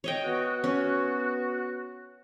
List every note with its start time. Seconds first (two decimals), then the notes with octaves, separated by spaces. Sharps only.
0.04 C#5 D#5 G5
0.23 B3 F#4
0.64 C#4